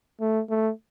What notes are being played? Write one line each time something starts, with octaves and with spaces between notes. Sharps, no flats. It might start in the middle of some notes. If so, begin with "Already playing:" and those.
A3
A3